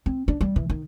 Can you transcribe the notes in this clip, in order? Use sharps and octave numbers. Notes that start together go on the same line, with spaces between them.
C4
D4
G3
E3
D#3